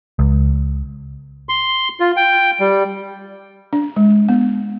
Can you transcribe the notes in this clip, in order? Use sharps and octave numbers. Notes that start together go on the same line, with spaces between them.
C#2
C6
F4
G5
G3
D4
G#3
B3